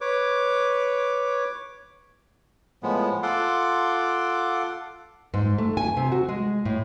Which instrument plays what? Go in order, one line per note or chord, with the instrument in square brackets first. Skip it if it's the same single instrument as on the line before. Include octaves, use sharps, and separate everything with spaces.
[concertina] B4 C#5 D6
[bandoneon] A2 F3 G#3 B3
F4 A4 F#5 C6 D6
[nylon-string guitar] G#2
A3
G#5
C3
F#4
G#3
A2